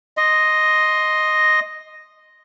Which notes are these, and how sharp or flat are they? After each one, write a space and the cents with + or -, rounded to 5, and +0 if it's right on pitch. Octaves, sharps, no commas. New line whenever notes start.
D#5 +0 C6 +5